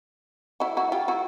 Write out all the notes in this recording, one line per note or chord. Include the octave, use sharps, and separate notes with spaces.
E4 F#4
E4 F#4
F4 G4
E4 F#4